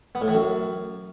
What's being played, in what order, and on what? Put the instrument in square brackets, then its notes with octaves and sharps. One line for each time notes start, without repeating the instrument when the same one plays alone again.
[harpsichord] B3
A2
E3
F#2